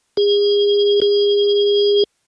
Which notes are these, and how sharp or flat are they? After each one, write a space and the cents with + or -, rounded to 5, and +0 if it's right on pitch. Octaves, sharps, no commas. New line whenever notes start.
G#4 -30
G#4 -30